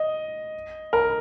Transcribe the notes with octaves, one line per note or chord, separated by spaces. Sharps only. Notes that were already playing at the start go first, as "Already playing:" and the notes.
Already playing: D#5
A#4